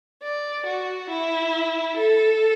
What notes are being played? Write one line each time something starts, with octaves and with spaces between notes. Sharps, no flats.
D5
F#4
E4
A4